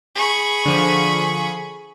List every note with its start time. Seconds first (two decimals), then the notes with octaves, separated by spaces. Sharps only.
0.15 G#4 B5 C#6
0.65 D3 F3 D#7